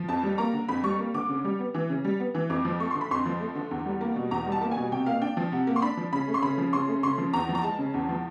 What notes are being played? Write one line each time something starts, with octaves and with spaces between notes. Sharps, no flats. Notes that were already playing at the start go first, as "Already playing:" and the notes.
Already playing: F3
F2 A5
G3
A#3 A#5
D3
F2 B5
G3 C#6
A#3
D3 D6
C#3
G3
B3
E3
C#3
G3
B3
E3
F2 D6
F3
A3 C#6
D3 C6
B5
F2 C6
F3
A3
D3
E2
G3
A#3
B2
E2 A#5
G3
A5
A#3
G#5
B2
C3 G5
A#3 F5
D4 G5
F3
C3 F#5
A#3
C6
D4 B5
F3
C#3 B5
A3
C6
C#3 B5
F3
C#3 C6
A3
C#3 C6
F3
E2 A#5
F3
A#5
G#3 A5
C#3
E2
F3